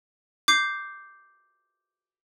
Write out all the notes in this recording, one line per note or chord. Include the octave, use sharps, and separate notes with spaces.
D6 G6 C7